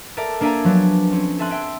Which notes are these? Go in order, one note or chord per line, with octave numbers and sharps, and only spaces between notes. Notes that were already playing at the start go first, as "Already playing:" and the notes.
A4 A#4 D5 E5
A#3 D4 D5 E5 G#5 A#5
F3 F#3 B3 D4
C4 C#4
A4 E5 G#5 C6 F#6
E5 G5